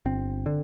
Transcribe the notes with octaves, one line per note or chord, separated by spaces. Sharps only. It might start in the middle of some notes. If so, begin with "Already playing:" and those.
G1 C4
D3